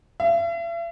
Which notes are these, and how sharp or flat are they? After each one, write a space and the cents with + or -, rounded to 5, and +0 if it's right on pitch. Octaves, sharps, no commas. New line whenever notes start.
E5 +45